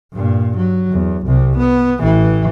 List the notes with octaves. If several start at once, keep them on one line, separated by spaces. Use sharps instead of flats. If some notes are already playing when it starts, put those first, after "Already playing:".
G2 A#2
F#3
E2
C2 C3
B3
A1 E3